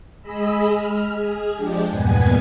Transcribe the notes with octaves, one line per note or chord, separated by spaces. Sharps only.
G#3 G#4 D#5 B5 E6
F6
G#4
F3 G#3 D4 G4
E2 G2 A#2 B3 B4 G#5